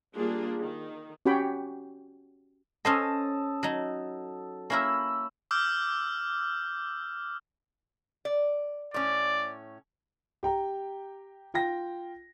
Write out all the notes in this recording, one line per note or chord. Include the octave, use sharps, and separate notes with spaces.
G3 A#3 D4 F4 G#4
D#3
C#4 F#4 G4 C#5 G5 B5
C#4 A4 C5 D#5 A5 D#6
F#3 D#4
A#3 C#4 E4 A#4 B5 E6
D6 E6 F6 G6
D5
A2 C#4 D5
G4 G5 A#5
F4 G5 A#6